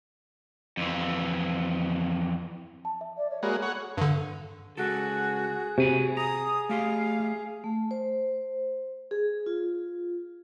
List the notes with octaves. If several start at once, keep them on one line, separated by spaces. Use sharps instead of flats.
F2 E3
A5
E5
D5
C#5
G#3 A#3 F#4 G#4 B5
A4 C#5 F#5
G2 D3
C#2 F#4 G#4 A4
C3 F#4 G#5 B5
A#5 D#6
A3 G4 F5 C6
A3
C5
G#4
F4